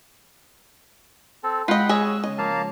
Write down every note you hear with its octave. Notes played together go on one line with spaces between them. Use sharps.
C4 A4
G#3 C4 F4 D#5 F#5 G5 B5
G#4 C#5 D#5 E6
C#3 C#4 D#5
F3 A#3 A4 F5 A5 A#5